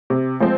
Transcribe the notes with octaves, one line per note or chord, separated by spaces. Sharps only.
C3
F3 G#3 C4